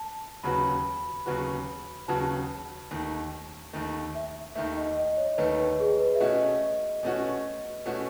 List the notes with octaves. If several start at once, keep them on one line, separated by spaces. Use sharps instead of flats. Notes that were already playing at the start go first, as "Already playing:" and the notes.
Already playing: A5
D#2 C#3 F#3 B3 F#4 B5
D#2 C#3 F#3 B3 F#4
D#2 C#3 F#3 B3 F#4 A5
D#2 D#3 A3
D#2 D#3 A3
E5
D#2 D#3 A3 E5
D#5
D#5
C#5
C#5
D#2 D#3 A3 B4
B4
G#4
B4
E5
B2 A3 C#4 F#4 D#5
B2 A3 C#4 F#4
B2 A3 C#4 F#4